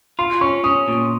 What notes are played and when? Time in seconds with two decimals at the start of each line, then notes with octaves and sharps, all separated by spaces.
0.19 F4 C6
0.41 C#4 C#6
0.64 C#4 D#6
0.88 A#2